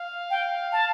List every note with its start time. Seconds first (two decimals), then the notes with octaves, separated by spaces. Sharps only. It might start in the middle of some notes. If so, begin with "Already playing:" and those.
Already playing: F5
0.30 G5
0.72 A5